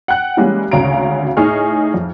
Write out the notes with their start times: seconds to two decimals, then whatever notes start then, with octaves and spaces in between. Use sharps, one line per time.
0.08 F#5 G5 F#6
0.37 E3 G3 G#3 A#3 C#4
0.71 G#1 D2 C#3 F#4 A#5 D7
1.37 A2 D#4 G#4 C#6 F6
1.94 F2